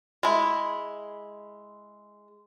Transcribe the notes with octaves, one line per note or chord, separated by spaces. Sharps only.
G#3 E4